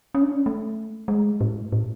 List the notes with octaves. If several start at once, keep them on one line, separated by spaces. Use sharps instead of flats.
C#4
D4
C#4
A3
G#3
A2
A2